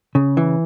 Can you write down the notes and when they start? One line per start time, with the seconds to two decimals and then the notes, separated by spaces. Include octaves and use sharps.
0.15 C#3
0.37 E3